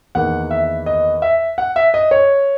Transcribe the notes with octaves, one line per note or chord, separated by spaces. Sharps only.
E2 D#3 A#3 F#5
E5
D#5
E5
F#5
E5
D#5
C#5